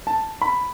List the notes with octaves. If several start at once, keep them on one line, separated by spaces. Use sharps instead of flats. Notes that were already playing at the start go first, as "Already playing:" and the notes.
A5
B5